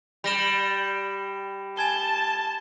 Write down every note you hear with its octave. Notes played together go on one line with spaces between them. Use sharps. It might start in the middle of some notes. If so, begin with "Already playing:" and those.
G3 B5 A#6 E7
G#5 A5 G#6 G7